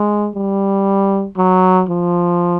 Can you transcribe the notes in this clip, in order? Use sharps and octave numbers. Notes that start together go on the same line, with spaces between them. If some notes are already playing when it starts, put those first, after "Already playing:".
Already playing: G#3
G3
F#3
F3